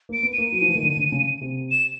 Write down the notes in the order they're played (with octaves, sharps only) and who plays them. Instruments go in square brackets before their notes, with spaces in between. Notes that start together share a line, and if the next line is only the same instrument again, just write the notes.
[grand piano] A#3
[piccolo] D7
[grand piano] B3
[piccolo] D#7
[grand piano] A#3
F#3
F3
E3
D#3
D3
D3
C#3
C3
[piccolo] E7